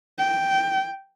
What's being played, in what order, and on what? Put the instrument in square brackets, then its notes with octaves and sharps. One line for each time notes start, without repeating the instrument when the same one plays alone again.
[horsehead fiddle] G5